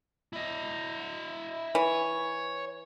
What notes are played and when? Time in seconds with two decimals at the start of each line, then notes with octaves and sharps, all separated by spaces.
0.33 E4 D#5
1.75 E3 C#5